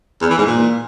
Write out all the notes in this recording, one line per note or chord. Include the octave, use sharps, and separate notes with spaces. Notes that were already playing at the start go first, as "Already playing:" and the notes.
E2
E3
G#2
A#2